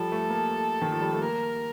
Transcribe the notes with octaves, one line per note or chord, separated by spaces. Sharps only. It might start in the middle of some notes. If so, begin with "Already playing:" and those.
Already playing: F3 G3 A4
A3
A#3
A3
D#3
F3
G3
A3
A#3 A#4